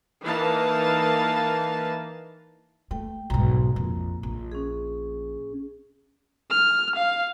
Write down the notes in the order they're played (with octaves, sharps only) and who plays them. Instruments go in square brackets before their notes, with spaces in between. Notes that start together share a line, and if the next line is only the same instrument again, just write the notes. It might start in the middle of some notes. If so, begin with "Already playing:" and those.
[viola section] E3 A#3 D#4 F5 A5
[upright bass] A3 [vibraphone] G5
[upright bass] B1 G#2 [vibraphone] A#5
[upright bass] A#1 F2
A#1
[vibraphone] C#4 G#4
[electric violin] F6
F5